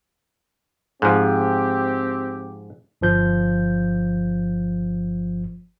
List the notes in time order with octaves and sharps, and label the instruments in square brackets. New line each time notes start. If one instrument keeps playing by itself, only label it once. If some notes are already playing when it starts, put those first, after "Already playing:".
[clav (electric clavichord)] G#2 F3 [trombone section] C4 G4
[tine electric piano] G1 F3 G6